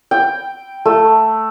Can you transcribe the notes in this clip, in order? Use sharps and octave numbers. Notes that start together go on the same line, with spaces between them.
G5
A3